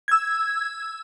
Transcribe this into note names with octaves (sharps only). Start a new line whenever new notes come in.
E6 G#6